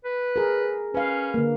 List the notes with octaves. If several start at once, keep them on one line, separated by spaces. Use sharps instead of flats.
B4
G#4 A#4
C#4 B4 F5
D3 A#3